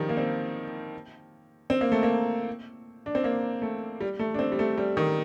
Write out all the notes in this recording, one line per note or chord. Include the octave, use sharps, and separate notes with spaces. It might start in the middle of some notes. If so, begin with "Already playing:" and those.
Already playing: D#3 F3 G3
A#3
C4
C4
A#3
A3
A#3
D4
C4
A#3
A3
G3
A3
D4
C4
G3
A3
G3
D#3